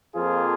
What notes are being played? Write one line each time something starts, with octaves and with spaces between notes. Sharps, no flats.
F2 F3 A#3 F4 G#4